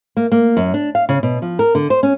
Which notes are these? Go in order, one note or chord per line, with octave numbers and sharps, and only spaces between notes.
A#3
A#3
F#2
D4
F5
C#3
B2
F3
A#4
D3
C5
C#4